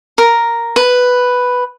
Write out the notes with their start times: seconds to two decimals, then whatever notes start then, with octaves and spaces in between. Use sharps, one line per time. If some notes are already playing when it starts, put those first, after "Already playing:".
0.18 A#4
0.76 B4